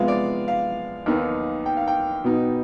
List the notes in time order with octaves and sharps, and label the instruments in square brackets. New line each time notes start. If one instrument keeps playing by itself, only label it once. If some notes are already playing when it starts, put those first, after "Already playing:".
Already playing: [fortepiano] C3 F3 G#3 B3 F5
D5
F5
D#2 D#3 B3 D#4
G5
F5
G5
B2 B3 D#4